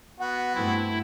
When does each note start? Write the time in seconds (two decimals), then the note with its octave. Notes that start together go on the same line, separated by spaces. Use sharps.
0.20 B3 F#4 F#5
0.55 G2 A3 C4 E4